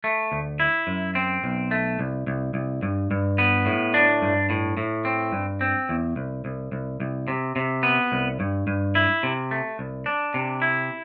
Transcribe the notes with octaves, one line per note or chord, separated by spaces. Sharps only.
A3
D2
E4
F#2
C4
B1
A3
C2
C2
C2
G2
G2
B3
A2
D4
G2
A2
A2
C4
G2
C4
E2
C2
C2
C2
C2
C3
C3
B3
C2
G2
G2
E4
C3
A3
C2
D4
C3
E4